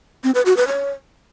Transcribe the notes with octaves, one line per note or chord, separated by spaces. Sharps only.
C4
B4
F#4
B4
C#5